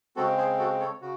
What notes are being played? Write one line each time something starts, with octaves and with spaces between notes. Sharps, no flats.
C#3 G#3 C4 F#4 A4
G#4 C5
F#4 A4
A4 C#5
C#3 F#4